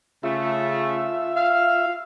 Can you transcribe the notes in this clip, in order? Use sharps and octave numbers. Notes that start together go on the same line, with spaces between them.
C#3 A3 F4 E5
F5